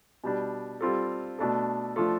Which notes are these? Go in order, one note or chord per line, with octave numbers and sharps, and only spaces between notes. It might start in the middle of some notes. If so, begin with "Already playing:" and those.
B2 G3 D4
G3 C4 F4 A4
B2 A3 D4 A4
F3 A3 D4 F4 A4